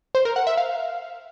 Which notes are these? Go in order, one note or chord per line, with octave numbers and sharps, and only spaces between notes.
C5
A#4
F#5
E5
F5